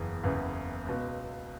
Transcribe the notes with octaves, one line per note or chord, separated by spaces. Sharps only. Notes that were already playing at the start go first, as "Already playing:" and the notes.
Already playing: F#1 E2 C#3 E3 G#4
F#1 E2 C#3 E3
C#2 B2